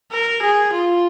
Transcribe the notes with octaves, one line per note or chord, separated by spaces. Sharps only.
A#4
G#4
F4